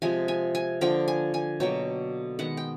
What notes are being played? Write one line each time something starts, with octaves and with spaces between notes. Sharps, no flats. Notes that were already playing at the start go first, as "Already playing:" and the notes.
C3 F3 G#3 G#5
G#5
G#5
D3 F3 A#3 G5
G#5
G#5
B2 F#3 A#3 G5
D#3 G#3 B3 F#5
G5